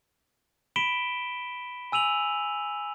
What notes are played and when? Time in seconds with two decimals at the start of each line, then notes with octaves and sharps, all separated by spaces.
0.76 B5 B6 D7 E7 G7
1.92 G#5 E6 D#7 F7 F#7